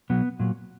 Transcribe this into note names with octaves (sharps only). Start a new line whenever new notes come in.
B2 F#3 B3
A#2 F#3